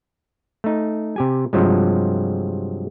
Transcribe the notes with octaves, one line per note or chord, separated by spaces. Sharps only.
A3 D#4
C3 G4 G#5
G2 C3 F3 F#3 G#3